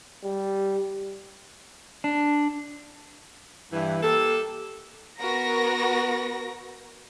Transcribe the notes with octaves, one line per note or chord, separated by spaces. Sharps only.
G3
D4
G2 E3
A#3 G4 A4
B3 F#4 A#4 A#6